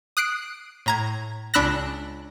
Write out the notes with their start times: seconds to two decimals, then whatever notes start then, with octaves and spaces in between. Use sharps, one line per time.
0.17 D#6 F#6 C7 D7
0.86 A2 A#5 G#6
1.54 C#2 D4 B5 E6 F#6 A#6